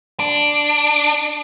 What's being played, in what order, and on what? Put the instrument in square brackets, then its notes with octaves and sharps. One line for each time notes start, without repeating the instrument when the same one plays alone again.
[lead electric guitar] D4